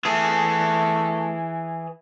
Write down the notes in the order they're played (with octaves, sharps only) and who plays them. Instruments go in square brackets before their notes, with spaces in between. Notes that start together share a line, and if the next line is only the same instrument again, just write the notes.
[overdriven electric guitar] E3 G#4 [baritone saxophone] A3